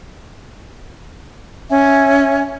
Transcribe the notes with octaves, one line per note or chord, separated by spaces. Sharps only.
C#4 E5 G#5